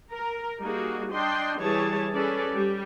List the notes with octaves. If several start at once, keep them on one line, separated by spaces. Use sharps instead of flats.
A#4
G3 A#3 D#4 F#4 G#4
D4 D#5 G5 C6
E3 G3 G#4 C#5 A5
C#4 G#4 A4 B4 D5
G3 G4